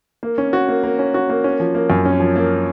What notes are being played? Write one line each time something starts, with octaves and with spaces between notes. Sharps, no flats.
A#3
C#4
F#4
A#3
A#3
C#4
F#4
A#3
C#4
F3
A#3
F#2
C#4
F3
A#3